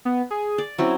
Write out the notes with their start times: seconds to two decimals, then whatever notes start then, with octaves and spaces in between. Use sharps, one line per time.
0.05 B3
0.31 G#4
0.58 D5
0.78 F#3 C4 C#4 E4